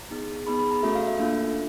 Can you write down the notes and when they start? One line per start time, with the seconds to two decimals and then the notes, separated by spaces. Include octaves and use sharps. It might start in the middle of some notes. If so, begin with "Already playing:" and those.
Already playing: A#5
0.11 B3 D#4 G#4
0.47 B3 D#4 G#4 B5
0.59 B5
0.71 A#5
0.83 A3 C#4 F#4 A4 E5
0.95 F5
1.07 E5
1.19 A#3 D4 F4 A4